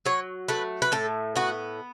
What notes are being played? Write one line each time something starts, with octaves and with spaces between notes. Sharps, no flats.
F#3 C#5
A3 B4
B4
A2 A4
B3 F#4